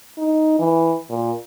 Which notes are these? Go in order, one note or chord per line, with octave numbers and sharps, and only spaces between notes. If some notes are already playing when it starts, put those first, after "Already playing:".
D#4
E3
A#2